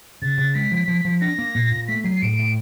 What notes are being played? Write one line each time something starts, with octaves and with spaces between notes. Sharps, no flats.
C#3 A6
C#3
G#3 B6
F3
F3
F3
D4 A#6
A#3
A#2
A#2
A3 B6
F#3 C7
A2 D7
A2